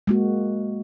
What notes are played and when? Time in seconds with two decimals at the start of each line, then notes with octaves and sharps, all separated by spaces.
0.07 G#3 A#3 F#4